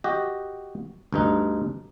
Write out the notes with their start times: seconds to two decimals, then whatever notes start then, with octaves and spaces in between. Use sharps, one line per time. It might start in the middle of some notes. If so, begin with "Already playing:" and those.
0.04 F#4 G4 D#5
1.13 D2 G2 D#4